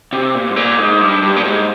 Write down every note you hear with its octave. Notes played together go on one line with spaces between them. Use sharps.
C3
A#2
G#2
A#2
G#2
G2
G2
A#2
G#2